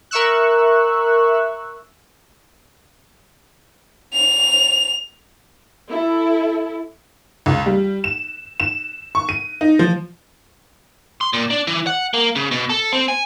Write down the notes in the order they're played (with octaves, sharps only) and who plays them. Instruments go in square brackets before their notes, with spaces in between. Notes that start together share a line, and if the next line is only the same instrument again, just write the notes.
[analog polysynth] A#4 E5 C#6 E6 F#6
[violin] F7
[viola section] E4 A4
[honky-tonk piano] C#2
G3
E7
E7
C#6
D#7
D#4
F3
[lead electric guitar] C6
A#2
D4
E3
F#5
A#3
C#3
B2
A4
C4
G#5